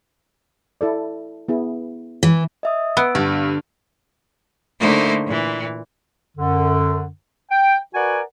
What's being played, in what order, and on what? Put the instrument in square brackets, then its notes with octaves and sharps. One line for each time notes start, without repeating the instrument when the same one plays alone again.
[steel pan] E4 A4 D5
B3 E4 G#4
[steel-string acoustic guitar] E3
[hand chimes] D#5 E5 D#6
[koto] B3 [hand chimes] E6 D7
[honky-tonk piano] G2 [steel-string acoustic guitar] D3
[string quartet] D3 A3 A#3 D#4 E4 C5
A#2 E3
[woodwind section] F#2 D3
G5
F#4 A#4 B4 D5 F#5 G#5